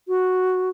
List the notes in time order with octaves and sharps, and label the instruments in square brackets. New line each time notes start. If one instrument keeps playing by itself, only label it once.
[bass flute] F#4